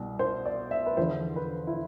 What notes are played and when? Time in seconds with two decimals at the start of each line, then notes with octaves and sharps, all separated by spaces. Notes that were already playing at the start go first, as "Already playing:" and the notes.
Already playing: C2 B2
0.19 C5
0.46 D5
0.71 E5
0.86 B4
0.97 E2 D3 F3 C5
1.36 B4
1.67 E4